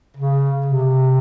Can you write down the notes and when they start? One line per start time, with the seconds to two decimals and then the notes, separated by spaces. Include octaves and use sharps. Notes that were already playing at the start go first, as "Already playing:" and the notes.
0.17 C#3
0.66 C3